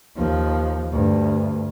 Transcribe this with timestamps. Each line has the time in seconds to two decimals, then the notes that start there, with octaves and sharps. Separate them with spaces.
0.16 D#2 F3
0.92 D2 G2